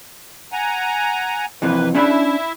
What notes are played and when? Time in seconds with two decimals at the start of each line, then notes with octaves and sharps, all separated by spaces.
0.52 F#5 G#5 A#5
1.62 F2 C3 E3 A#3 B4
1.95 C#4 D4 E4 E5 B5